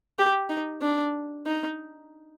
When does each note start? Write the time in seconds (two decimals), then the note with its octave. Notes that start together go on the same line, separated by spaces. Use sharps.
0.19 G4
0.49 D#4
0.82 D4
1.46 D#4